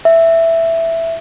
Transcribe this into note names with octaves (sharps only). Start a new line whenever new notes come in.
E5